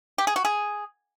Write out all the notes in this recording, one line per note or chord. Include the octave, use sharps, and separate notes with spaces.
G4
G#4
F#4
G#4